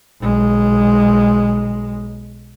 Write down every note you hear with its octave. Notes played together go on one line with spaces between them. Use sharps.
B1 G#3